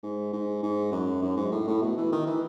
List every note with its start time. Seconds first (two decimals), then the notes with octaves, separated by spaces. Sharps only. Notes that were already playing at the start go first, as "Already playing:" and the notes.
0.03 G#2
0.33 G#2
0.63 G#2
0.92 F#2
1.22 F#2
1.37 G#2
1.52 A2
1.68 A2
1.82 B2
1.97 E3
2.12 D#3
2.27 E3